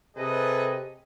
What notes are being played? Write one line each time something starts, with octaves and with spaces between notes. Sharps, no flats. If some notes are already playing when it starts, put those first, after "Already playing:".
C3 G#4 A4 B4 D#5